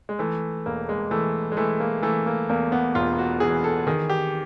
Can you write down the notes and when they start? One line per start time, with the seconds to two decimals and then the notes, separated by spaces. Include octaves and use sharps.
0.09 G#3
0.19 E3 A3
0.66 E1 A#3
0.89 G#3
1.11 E3 A3
1.52 G#3
1.57 E3 A3
1.80 A#3
2.03 E3 A3
2.26 A#3
2.49 E2 A#3
2.72 B3
2.95 E1 F4
3.19 F#4
3.40 E3 G#4
3.64 A4
3.87 D#3 G#4
4.10 G4